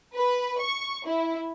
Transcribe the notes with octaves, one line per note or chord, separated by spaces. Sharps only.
B4
C#6
E4